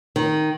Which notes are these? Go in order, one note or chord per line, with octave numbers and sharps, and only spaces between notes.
D#3